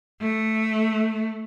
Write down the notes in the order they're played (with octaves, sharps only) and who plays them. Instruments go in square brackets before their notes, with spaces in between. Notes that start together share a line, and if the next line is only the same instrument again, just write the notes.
[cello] A3